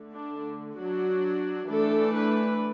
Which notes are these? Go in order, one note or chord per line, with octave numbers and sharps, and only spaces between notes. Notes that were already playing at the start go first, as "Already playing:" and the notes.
Already playing: D3 A3
D4
F#3 D4 F#4
E3 A3 D4 A4
B4